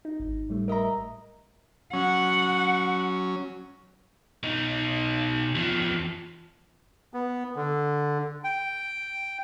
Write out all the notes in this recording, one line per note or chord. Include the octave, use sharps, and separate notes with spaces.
D#4
G#1
A2 G3 A3
A#4 D#5 E5 A#5
F#3 C#4 F#5
B2 D#4
E2 F3
B3
D3
G5